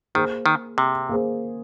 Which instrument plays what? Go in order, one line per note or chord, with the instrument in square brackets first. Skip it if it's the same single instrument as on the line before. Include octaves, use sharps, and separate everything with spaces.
[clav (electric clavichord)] D#3 [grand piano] A#3 G#4 C5
[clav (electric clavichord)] D#3
C3
[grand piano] A#3 G#4 C5